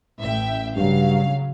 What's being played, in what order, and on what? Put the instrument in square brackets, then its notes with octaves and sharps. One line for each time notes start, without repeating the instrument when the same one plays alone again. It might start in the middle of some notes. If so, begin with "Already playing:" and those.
[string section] A1 E5 G5
[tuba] G2 [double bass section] C#3 F#3 [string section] F5